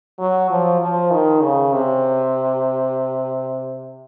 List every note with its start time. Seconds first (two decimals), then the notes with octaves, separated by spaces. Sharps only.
0.19 F#3
0.50 F3
0.80 F3
1.11 D#3
1.41 C#3
1.73 C3